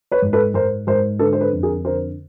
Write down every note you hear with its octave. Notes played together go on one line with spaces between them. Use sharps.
B4 C#5
G#2
A4 B4
G#2 A#4 C5
G#2 A#4 C5
D3 A4 B4
C5
A4 B4
F2
G#4 A#4
D3 A#4 C5